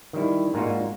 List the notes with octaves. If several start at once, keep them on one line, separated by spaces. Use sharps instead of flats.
D#3 G3 E4
G#2 A#3 D4 D#4 F4 F#4